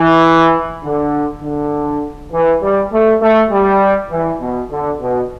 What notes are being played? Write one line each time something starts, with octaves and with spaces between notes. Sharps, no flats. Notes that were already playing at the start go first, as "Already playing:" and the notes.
Already playing: E3
D3
D3
E3
G3
A3
A3
G3
E3
B2
D3
B2